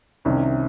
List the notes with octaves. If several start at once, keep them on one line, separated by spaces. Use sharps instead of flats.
C2 C3 D#3 C#4